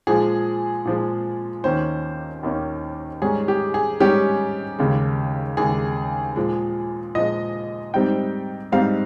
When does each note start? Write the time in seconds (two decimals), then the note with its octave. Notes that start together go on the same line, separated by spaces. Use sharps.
0.07 A#2 F3 G#3 G#4
0.85 A#2 F3 G#3
1.64 D#2 D#3 A#3 C#4 C5
2.43 D#2 D#3 A#3 C#4
3.22 G#2 G3 C#4 G#4
3.48 G4
3.74 G#4
4.00 G#2 G3 C#4 G4
4.79 D#2 C#3 G#3
5.57 D#2 C#3 G#3 G#4
6.36 A#2 F3 G#3
7.15 A#2 F3 G#3 D#5
7.94 G#2 G3 C4 D#4 G5
8.72 G#2 G3 C4 D#4 F5